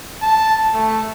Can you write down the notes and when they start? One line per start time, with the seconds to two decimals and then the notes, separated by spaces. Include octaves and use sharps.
0.22 A5
0.74 A3